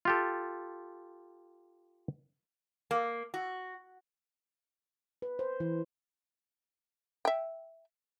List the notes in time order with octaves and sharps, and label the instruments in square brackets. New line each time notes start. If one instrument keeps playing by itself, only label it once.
[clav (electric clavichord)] F4 G4 A4
[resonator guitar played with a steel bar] A#3
F#4
[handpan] B4
C5
E3
[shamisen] E5 G5